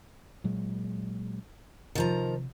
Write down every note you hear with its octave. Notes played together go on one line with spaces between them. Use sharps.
A#2 F#3 G#3
C3 D#3 F3 A#5